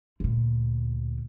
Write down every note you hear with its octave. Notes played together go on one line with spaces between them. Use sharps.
D2 A#2